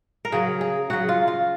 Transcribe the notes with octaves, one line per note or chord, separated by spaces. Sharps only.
A#4
C#3 F#3 G#4
G#4
C#3 F#3 F#4
F4
F4